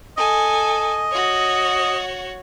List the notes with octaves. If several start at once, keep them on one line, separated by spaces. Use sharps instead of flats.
A4 D#5 G#5
F#4 C#5